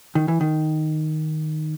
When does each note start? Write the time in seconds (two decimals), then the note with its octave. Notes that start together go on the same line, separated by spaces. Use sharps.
0.15 D#3
0.28 E3
0.41 D#3